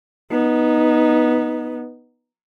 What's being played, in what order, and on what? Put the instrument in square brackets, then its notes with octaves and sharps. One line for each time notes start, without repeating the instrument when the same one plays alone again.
[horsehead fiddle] B3 D#4